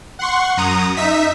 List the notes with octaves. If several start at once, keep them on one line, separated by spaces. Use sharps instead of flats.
F#5 C6 C#6
F#2 A#5 D#6
D#4 E5 B6